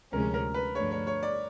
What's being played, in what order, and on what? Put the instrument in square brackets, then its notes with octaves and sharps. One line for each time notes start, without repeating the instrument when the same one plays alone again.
[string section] D2 C3 F3 G#3 C#4 [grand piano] A#4
[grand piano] A#4
B4
[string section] G2 D3 F3 A3 D4 [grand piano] C#5
[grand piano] C#5
C#5
D5